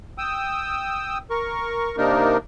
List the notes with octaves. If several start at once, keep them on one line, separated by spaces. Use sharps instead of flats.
G5 D#6 E6
A#4 C#6
C3 A#3 D4 D#4 A#4